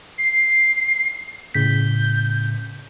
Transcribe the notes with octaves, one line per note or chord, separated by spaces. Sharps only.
C7
A2 C#3 G6 B6